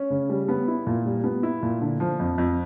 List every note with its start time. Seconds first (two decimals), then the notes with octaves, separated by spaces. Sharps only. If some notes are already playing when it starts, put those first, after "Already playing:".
Already playing: C#4
0.10 C#3
0.30 G3
0.48 B3
0.68 E4
0.87 A#2
1.06 G3
1.24 B3
1.43 E4
1.63 A#2
1.81 D3
2.00 F3
2.20 F2
2.38 F2